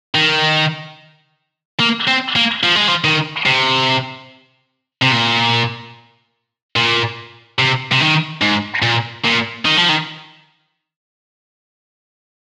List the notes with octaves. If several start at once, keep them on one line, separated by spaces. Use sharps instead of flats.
D#3
A#3
C4
A#3
F3
G#3
F3
D#3
C3
C3
A#2
A#2
C3
C3
D#3
G#2
A#2
A#2
D#3
F3
D#3